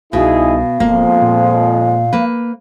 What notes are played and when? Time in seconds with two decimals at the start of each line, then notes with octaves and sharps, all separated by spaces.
0.13 C2 B2 D#4 E4 G#4 F5
0.80 D1 F2 F3 G#3 A#3
1.22 A#2
2.13 A#3 B4